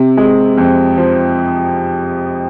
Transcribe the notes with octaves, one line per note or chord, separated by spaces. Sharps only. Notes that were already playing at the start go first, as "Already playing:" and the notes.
Already playing: C3
G#3
F2
F3